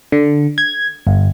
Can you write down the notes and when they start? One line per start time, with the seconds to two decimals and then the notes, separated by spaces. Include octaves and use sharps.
0.12 D3
0.58 G#6
1.07 G1